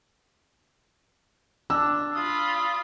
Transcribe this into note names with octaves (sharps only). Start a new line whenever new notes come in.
D4 E6
F4 B5 D#6